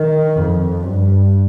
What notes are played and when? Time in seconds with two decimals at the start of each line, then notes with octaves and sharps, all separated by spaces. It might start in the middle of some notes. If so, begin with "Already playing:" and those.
Already playing: D#3
0.37 F2
0.84 G2